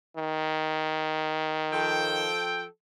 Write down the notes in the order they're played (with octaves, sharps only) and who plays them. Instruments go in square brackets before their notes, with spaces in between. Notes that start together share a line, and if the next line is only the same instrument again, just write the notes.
[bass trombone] D#3
[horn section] F3 A4 G5